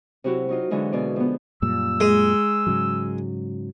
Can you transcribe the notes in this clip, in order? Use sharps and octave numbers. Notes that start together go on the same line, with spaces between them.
C3 F#3 E4 F#4 G4
F#3 D#4 F4
D3 E3 F#3 G#3 E4
B2 B3 G#4 D5
F3 B3
F#2 A#2 G3 E6
G#3
G#2 C#3 F#3